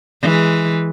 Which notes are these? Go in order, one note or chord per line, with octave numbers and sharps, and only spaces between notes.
E3 G#3